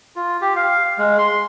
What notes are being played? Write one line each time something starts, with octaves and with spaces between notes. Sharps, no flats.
F4
G4
F5
G#3
C6